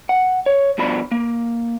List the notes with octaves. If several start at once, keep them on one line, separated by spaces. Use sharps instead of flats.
F#5
C#5
G2 B2 F3 D4 B5
A#3